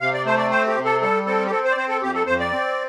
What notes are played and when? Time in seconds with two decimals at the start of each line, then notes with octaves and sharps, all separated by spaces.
0.01 C3 F5
0.14 D5
0.26 A3 C5
0.38 D5
0.51 C4 C5
0.68 G4
0.75 C3
0.85 A4
1.02 G3 A4
1.26 C4 A4
1.46 G4
1.51 C4 A4
1.65 C5
1.71 D5
1.77 C4 C5
1.89 A4
2.02 F2 G4
2.14 A4
2.26 F2 C5
2.40 D5
2.52 C4